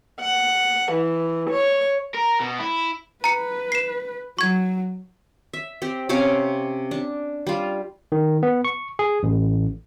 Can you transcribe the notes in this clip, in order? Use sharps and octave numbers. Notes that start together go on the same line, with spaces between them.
F#5
E3
C#5
A#4
B2
E4
B4 A#5 C#7
C7 E7
F#3 C#6 G#6
E5
C4 G4
C3 C4 C#4 F5
D4
G3 F4
D#3
B3
C#6
G#4
A1